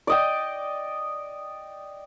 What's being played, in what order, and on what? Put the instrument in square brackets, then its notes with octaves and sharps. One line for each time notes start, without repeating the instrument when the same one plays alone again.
[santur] D5 D#5 G5